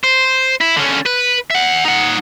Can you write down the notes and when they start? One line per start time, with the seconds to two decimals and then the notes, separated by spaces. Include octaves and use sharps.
0.04 C5
0.61 E4
0.77 D3 C#4
1.06 B4
1.51 E5 F#5
1.85 D#4 F#5